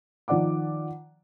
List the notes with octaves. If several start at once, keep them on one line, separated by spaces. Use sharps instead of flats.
D#3 F3 D5 F#5 D6